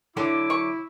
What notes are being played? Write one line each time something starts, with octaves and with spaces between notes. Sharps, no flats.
D3 F#3 E4 A4 D6
C#6